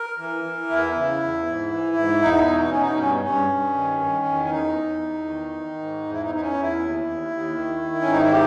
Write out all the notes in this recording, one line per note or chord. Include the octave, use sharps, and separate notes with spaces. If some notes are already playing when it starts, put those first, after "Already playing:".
Already playing: A#4
E3
E3
E2 E4
C#3
E2
G#2
E3
G#2
E2 D#4
B2
D#4
B2 C#4
D#4
G2 C#4
G2 C#4
G2
D#3
D#3
E2
C#4
E2 D#4
E2
E2
D#3
D#3
G#2
E2
E4
D#4
E2
D#4
C#4
E2
E4
D#2
D#2
D#2
D#3
D#3
C#4
G#2
D#4
E4
G4